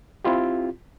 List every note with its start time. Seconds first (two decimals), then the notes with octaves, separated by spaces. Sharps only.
0.25 C4 E4 F4 G4